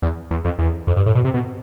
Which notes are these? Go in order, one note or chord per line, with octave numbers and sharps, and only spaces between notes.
E2
E2
F2
E2
F2
G2
A2
B2
C3
B2